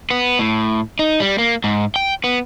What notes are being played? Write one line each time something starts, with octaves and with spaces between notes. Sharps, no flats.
B3
A2
D#4
G3
A#3
G#2
G5
B3